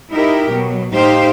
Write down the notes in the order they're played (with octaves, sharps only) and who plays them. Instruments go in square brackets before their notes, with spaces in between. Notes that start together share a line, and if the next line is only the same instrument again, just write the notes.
[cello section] D#4 E4 G4 A#4
B2 F#3
A2 D#4 G4 C5 F5